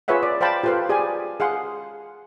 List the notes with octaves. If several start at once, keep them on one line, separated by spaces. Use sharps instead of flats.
F4 G#4 B4 C#5 E5 F#5
D5
C5 F5 G5 A5 B5
F4 G4 A4 B4 C5 F5
G4 G#4 D5 G#5
G#4 F5 F#5 C6